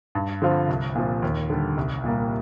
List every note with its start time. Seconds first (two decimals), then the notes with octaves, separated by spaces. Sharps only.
0.15 G2
0.42 D3 F3 C4 F4
0.69 C2
0.95 A#2 F3 C4
1.22 D#2
1.50 D3 G3
1.77 C2
2.04 A#2 G3 A#3